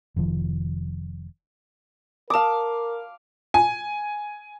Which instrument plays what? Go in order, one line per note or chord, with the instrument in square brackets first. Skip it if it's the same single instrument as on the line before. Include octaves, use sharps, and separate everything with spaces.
[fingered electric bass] F1 D#3 F3
[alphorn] A#4 [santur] F5 D6 [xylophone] A5 D#6
[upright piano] G#5